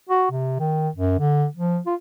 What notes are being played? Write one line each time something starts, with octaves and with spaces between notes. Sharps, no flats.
F#4
C3
D#3
F#2
D3
F3
F4